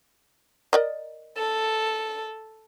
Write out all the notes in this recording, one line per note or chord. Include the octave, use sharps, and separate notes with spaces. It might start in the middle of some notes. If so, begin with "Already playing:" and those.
A#4 D5 D#5
A4